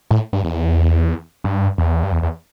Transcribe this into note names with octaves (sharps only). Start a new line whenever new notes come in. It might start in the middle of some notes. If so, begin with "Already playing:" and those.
A2
G2
E2
G2
E2
G2
E2
E2